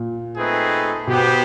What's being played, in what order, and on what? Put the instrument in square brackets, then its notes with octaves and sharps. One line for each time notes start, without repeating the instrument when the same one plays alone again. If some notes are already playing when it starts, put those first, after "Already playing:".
Already playing: [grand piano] A#2
[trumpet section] A3 C4 D#4 G#4 B4
[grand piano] B2 [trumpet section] B3 D#4 G4 C5